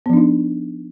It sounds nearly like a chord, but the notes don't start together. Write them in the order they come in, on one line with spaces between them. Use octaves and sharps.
B3 F3 D4 D#4